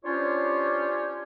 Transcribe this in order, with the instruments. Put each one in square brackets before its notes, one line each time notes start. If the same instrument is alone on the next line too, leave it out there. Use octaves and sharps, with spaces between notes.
[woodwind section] C#4 D4 F4 G4 C5 C#5